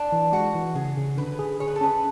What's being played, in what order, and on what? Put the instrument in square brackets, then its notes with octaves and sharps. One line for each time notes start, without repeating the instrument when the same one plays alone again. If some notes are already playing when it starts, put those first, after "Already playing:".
Already playing: [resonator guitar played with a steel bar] D4
[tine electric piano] E3
[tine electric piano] G#3 [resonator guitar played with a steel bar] F#4
[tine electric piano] E3
[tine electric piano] C#3 [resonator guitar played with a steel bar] G#4
[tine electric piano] C#3
[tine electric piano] D3 [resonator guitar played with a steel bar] B4
[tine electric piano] G#4
[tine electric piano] G#4 [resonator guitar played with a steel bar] C#5
[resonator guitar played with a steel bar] B4
A4
[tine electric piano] C#4 [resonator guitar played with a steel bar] B4